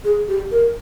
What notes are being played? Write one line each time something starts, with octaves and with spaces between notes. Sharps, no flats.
G#4
G4
A#4